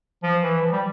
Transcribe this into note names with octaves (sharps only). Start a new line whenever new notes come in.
F3
E3
F3
G3